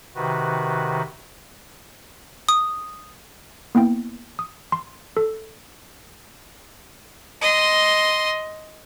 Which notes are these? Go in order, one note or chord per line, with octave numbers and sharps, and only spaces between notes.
C3 D#3 F#4 B4
D#6
A#3 B3 E4 G5
D#6
C6
A4
D#5 C6